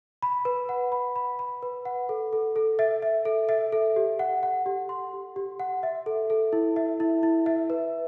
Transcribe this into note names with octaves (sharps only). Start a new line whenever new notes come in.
B5
B4
F#5
B5
B5
B5
B4
F#5
A4
A4
A4
E5
E5
A4
E5
A4
G4
F#5
F#5
G4
C6
G4
G4
F#5
E5
A4
A4
E4
E5
E4
E4
E5
B4